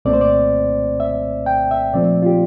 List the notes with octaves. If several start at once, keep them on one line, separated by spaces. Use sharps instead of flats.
C2 A#2 A3 C4 D5
C5
D5
E5
G5
E5
A#2 F3 A3 C4 D5
F4
G4